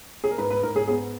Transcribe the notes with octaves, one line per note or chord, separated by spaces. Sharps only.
G#4
A#4
G#2 B4
B4
G#2 A#4
G#4
B3 G#4